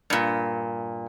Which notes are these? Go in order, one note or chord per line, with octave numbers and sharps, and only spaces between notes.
G2 A#2